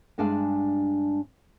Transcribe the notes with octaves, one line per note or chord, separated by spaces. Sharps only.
G2 G#3 D4 G#4 E5 F5